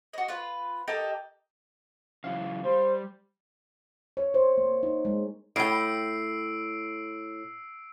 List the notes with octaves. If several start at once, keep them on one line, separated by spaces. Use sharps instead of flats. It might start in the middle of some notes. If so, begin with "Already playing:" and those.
F#4 D#5
F4 B4
G4 A4 A#4 D#5
C#3 E3 F#3 F5
G3 C5
C#5
C5
A#3
D#4
G#3
A2 G5 E6 C7 D7